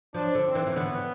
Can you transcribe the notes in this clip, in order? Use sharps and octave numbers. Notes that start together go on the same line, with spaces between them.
F3 D4
D3
C4
E3
E3
D3 B3